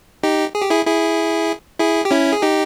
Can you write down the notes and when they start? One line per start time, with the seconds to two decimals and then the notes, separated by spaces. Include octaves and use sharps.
0.23 D#4 G4
0.55 G#4
0.62 G4
0.70 E4 G#4
0.86 E4 G#4
1.79 E4 G#4
2.05 G4
2.11 C#4 E4
2.32 G#4
2.42 D#4 G4